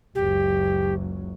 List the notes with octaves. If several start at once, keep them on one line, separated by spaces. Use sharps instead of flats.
F#1 C#2 F#3 G4